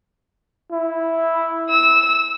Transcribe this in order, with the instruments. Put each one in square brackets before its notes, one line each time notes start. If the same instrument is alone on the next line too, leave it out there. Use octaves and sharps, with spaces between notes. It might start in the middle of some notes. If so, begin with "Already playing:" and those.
[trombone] E4
[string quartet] E6